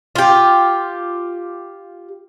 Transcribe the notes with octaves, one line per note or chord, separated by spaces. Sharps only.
F4 G4